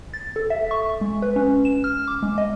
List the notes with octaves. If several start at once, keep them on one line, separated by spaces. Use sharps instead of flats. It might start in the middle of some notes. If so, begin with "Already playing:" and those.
A6
A4
E5
C#6
G#3
B4
C#4
E7
F6
D6
G#3
D#5